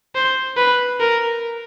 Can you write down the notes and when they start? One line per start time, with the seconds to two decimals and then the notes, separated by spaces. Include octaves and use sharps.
0.15 C5
0.57 B4
1.00 A#4